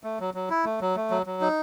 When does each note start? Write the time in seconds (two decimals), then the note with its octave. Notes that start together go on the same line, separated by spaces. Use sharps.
0.04 A3
0.20 F#3
0.34 F#3
0.50 E4
0.65 A3
0.81 F#3
0.96 A3
1.11 F#3
1.26 F#3
1.41 D#4